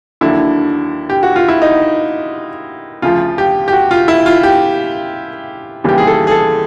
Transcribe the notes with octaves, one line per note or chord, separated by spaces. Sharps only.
D#2 D3 F#3 E4
G4
F#4
F4
E4
D#4
D2 C#3 F3 F4
G4
G4
F#4
F4
E4
F4
G4
D#2 C#3 E3 G3 G4
G#4
A4
G#4
A4